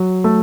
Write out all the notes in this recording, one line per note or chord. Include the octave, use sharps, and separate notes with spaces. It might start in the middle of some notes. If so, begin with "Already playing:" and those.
Already playing: F#3
A3